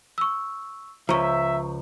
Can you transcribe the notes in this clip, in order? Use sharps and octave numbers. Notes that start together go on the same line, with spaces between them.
C#6 E6
C#2 F3 E5 A#5 C#6